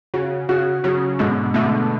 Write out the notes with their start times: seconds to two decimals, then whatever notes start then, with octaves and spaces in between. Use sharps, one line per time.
0.14 C#3 F#4
0.49 C#3 F#4
0.84 C#3 F#3
1.19 G#2 B2 D3
1.54 B2 D3 A3